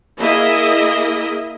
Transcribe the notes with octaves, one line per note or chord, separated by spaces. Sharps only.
A#3 E4 G#4 D#5